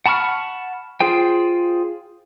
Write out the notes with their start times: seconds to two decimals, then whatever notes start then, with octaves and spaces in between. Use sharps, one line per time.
0.06 F#5 A5 B5 C#6 F6
1.00 F4 G#4 C5 G5